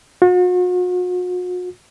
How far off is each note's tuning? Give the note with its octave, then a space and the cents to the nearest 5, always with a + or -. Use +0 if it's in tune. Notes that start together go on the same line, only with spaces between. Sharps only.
F#4 -40